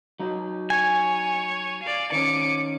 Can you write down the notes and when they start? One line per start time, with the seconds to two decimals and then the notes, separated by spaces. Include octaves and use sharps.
0.20 F#3 D#4
0.70 C#5 G#5
1.82 D5 F5
2.12 D#3 C#4 D6 C#7